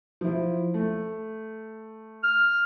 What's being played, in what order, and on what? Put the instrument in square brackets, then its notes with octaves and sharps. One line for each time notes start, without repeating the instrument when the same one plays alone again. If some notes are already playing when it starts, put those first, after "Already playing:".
[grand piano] F3 E4
A3
[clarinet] F6